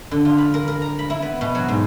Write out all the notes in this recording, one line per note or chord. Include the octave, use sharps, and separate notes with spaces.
D3
F4
B5
A#4
A#4
A#5
B5
E4
B3
B2
F#3
G#2